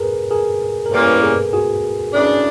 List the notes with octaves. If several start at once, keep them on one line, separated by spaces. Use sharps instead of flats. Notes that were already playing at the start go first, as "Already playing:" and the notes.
Already playing: G#4 A#4 B4
G#4 A#4
A#4
A2 E3 G3 A#3 C#4 A4 B4
G#4 A#4
F#4 G#4
C#3 E3 A3 D4